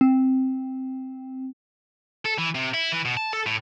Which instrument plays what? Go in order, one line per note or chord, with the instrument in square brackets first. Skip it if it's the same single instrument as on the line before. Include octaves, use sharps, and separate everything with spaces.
[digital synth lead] C4
[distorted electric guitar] A4
E3
C3
E4
E3
B2
A5
A4
A2